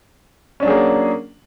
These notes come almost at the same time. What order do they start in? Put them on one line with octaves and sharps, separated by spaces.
C#4 D4 F#3 G#4 A#3